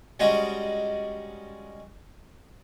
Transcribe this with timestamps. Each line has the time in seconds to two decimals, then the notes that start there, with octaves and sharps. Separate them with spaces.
0.20 G3 G#3 C#4 D#4 F#4